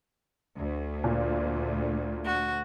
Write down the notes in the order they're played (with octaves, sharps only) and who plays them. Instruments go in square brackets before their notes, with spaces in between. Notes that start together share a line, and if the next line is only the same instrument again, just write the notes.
[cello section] D2
[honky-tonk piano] A#2
[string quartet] F#4